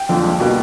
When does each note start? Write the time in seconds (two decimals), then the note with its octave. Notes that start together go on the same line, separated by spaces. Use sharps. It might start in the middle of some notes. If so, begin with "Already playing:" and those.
Already playing: G5
0.09 F2 D3 F3
0.24 C#2
0.40 B2 G3 A#3